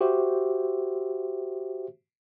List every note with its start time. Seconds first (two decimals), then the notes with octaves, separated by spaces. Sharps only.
0.01 F#4 G4 C5 E5